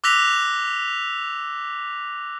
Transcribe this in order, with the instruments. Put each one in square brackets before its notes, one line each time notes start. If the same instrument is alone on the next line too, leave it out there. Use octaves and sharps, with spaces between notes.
[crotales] D6 E6 F#6 A#6 B6 F7